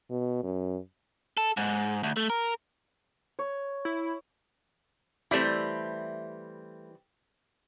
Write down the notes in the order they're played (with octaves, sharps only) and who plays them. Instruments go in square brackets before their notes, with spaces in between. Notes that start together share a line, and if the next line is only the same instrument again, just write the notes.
[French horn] B2
F#2
[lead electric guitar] A4
G#2
D2
A3
A#4
[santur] C#5
[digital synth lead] E4
[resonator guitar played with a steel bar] E3 G3 C4 [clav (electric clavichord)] A3 E4